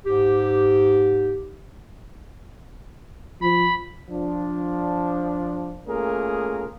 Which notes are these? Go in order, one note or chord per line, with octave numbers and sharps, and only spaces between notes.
G#2 G4
F3 B5
F3 D4
A3 A#3 C#4 F4 G#4 A#4